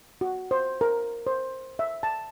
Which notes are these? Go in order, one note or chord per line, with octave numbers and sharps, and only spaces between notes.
F#4
C5
A#4
C5
E5
A5